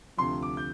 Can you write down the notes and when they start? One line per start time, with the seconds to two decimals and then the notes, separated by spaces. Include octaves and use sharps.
0.17 D2 C3 F3 C6
0.42 D6
0.57 G6